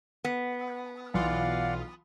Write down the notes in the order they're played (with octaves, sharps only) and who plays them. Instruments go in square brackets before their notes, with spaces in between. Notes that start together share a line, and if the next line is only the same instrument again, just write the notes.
[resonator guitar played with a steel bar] B3
[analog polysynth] B1 F4 [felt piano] E3 [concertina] D5 F5 F#5